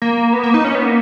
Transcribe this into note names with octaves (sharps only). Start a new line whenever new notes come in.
A#3
B3
A#3
D#4
C#4
B3
A#3